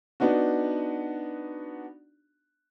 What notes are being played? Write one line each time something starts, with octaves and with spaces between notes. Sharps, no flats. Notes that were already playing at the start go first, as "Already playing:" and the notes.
B3 D4 D#4 F#4